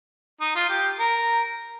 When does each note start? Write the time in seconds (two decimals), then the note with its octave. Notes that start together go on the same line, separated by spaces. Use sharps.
0.41 D#4
0.56 F4
0.70 G4
0.99 A#4